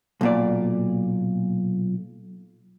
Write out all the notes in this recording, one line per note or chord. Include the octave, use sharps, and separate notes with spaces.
B1 A#2 D5